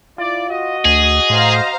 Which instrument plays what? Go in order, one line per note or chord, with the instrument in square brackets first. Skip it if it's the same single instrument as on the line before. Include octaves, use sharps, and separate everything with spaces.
[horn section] E4 D5 [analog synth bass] F4
[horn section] F#4 D#5
[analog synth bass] D2 [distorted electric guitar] G#4
[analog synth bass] A2 [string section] C5 F5 A#5